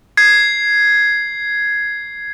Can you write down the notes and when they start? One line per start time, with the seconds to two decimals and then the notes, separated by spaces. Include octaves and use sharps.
0.17 G#6 C7